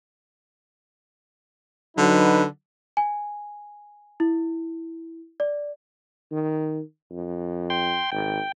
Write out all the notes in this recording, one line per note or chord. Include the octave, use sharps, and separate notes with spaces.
D3 F#3 D#4 B4
G#5
E4
D5
D#3
F2
G5 C6
G#1 G5